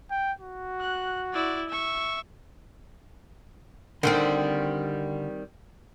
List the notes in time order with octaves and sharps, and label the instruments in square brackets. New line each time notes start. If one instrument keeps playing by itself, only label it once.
[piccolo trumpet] G5
F#4
[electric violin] F#6
E4 D5
E5 C#6
[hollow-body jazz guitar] D3 [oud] D#3 G3 C4